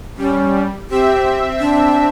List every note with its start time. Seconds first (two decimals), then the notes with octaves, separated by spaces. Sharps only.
0.18 G3 C#4
0.90 C4 G4 E5
1.60 D4